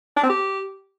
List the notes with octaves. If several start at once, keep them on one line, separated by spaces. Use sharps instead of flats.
D4
C4
G4